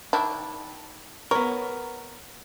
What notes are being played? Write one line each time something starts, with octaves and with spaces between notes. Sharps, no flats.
D#3 D4 E4
B3 A#4 C#5